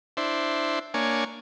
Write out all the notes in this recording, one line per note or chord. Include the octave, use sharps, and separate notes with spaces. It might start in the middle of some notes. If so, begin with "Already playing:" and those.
D4 E4 C5
A#3 D4 C#5 G#5